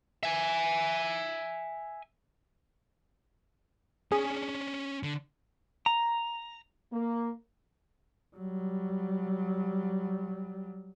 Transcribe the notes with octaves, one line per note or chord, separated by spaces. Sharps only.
E5 G#5
C#4 D4 G#4
D3
A#5
A#3
F#3 G3